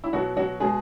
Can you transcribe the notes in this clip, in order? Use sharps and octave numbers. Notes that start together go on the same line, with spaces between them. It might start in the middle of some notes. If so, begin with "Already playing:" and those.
E4
B2 F#3 F#4
F#3 F#4
B2 G#3 G#4